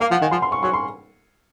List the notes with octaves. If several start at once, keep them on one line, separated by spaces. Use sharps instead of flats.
A#3 F5
F3 F#5
D#3 G#5
F3 C6
C6
C#6
F#3 C#6
C6